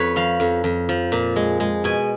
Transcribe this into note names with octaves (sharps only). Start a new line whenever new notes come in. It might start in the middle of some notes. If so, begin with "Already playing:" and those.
Already playing: F2 B4 C#5
F3 F5
F2
F2
F3
A#2
G#3
G#3
B2 G#5